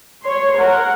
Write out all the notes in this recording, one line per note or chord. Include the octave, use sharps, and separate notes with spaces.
C#5 C6
A#4 F#5